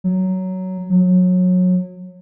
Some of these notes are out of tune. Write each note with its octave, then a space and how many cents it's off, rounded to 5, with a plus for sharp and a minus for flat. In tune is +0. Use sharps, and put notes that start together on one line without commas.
F#3 +10
F#3 -25